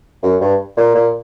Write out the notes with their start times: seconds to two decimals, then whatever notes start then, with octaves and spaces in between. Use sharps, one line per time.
0.23 F#2
0.41 G2
0.77 A#2
0.95 A#2